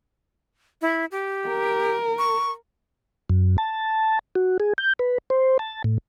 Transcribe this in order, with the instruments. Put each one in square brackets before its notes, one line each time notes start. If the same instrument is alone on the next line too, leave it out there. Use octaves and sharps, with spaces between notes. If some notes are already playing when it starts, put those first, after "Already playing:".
[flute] E4
G4
[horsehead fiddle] A#4
[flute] C#6
[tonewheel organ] F#2
A5
F#4
G#4
G6
B4
C5
A5
A2